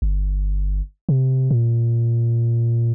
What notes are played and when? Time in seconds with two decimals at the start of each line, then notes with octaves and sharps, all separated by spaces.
0.02 G1
1.09 C3
1.51 A#2